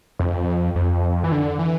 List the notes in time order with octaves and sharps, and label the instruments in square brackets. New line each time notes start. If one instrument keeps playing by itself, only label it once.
[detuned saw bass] F2
F2
E3
D3
E3